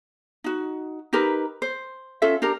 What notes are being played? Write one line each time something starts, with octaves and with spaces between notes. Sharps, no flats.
D#4 F#4
D#4 G4 A#4 B4
C5
C#4 F4 A4 E5
D4 G4 A#4